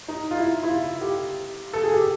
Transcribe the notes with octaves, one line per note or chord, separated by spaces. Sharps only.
D#4
F4
E4
E4
F4
G4
A4
G#4
G4